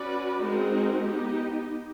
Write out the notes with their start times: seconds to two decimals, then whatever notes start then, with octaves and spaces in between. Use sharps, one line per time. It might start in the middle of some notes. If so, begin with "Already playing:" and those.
Already playing: C#4 F#4 B4 D5
0.42 G#3 C4 D#4 F#4 A#4
1.06 B3 D#4 G4